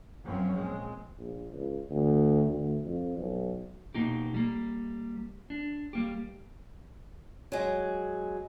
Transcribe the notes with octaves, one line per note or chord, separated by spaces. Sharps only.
F#2 F3 F#3 C4 C#4
A#2 G#3 C4
A#1
C#2
D2
D2
F2
B1
B2 A#3 D#4 G4
G3 A#3
D4
G3 A#3 G4
F#3 G#3